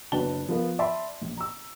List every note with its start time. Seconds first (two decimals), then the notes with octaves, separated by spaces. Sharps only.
0.12 F#1 F#3 D4 B4 A5 G7
0.48 F3 B3 F4 A#4 B4
0.79 D5 E5 A5 B5 C6
1.21 A#1
1.37 A#5 E6